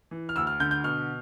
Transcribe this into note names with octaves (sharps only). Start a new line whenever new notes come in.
E3
F6
D2 E6
F6
D3 G6
G6
B2 F6